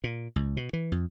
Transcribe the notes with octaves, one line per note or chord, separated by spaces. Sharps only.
A#2
C#2
B2
E3
F2